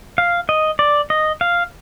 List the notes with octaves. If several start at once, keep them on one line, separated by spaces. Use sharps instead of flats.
F5
D#5
D5
D#5
F5